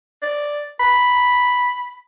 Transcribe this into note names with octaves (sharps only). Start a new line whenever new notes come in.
D5
B5